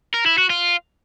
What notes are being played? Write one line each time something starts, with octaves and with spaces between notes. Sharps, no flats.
A#4
E4
F#4
F4